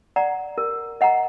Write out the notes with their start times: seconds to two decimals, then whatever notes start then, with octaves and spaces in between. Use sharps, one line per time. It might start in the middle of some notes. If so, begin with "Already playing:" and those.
0.16 D5 F#5 A#5
0.58 A#4
1.01 D#5 F#5 A#5